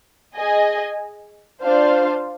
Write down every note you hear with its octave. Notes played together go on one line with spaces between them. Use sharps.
G#4 D#5 G#5
D4 F4 C5 F5